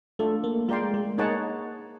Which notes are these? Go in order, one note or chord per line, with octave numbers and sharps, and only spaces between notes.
A3 D4 F4 A4
A#3
G#3 F4 A#4 D5 G5 C6
G#3
A#3 D#4 G#4 C#5 F#5 A5